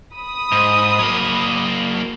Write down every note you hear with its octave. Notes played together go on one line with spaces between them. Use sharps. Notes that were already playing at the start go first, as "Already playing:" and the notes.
B5 D#6
G#2
F#3 A#3